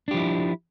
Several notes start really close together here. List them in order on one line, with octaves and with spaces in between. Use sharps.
D4 G4 F3 E4